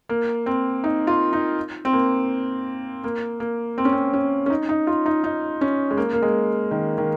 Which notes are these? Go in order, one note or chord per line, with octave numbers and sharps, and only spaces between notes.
A#3
C4
D#4
F4
D#4
C4
A#3
A#3
A#3
C4
C#4
C4
C#4
C#4
D#4
D#4
F4
D#4
D#4
C#4
G#3
A#3
A#3
G#3
D#3
D#3